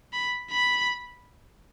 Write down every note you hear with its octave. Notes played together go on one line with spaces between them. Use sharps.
B5
B5